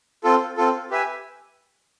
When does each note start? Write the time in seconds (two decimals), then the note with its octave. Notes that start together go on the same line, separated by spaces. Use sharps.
0.24 C4 F4 A4
0.57 C4 F4 A4
0.90 G4 B4 E5 G#5